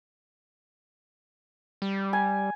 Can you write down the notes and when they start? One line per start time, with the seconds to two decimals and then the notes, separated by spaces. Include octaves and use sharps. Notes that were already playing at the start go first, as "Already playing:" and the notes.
1.82 G3
2.13 G#5